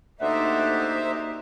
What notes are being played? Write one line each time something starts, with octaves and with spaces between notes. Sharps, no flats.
D2 A#3 D#4 G4 C5 D5 E5 F#5